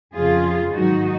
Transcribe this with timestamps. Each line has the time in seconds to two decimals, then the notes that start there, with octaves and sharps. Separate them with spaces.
0.15 F2 C#3 F3 F4 G#4
0.74 G#2 D#3 F#3 D#4 F#4